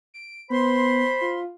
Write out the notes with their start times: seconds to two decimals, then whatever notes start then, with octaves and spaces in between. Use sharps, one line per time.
0.14 D7
0.50 B3 C5 B5 C6
1.21 F4